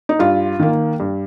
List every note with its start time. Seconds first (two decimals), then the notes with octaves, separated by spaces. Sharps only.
0.09 D#4
0.19 G2 F4
0.59 D#3 A#3
1.00 G2